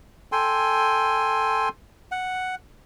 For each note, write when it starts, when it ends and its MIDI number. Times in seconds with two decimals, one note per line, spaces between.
0.32 1.69 69
0.32 1.69 79
0.32 1.69 80
0.32 1.69 84
2.12 2.55 78